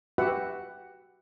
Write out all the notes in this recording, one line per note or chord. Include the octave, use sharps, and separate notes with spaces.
F#4 G4 B4 E5 F#5